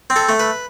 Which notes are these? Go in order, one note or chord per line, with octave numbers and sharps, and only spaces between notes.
C4
A4
A3
B4